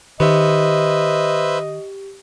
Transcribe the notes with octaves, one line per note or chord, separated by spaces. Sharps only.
D#3 G4 B4 C5 D#5 E5